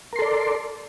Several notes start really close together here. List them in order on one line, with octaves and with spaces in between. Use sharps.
A#4 C6 A4 D5